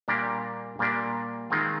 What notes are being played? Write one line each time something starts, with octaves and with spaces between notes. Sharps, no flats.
A#2 G3 A#3 D4 G4
A#2 G3 A#3 D4 G4
D#3 G#3 C4 F4